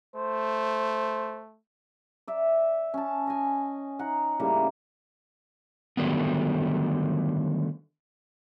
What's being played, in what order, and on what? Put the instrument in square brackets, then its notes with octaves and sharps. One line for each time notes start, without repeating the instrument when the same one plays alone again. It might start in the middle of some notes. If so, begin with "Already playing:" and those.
[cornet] A3 [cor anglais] C5
[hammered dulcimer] D5 E5
C#4 A5
D#5 G#5
D#4 F#5
A2 C#3 G3 A#3
[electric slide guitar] D3 D#3 F#3 G3 A3 B3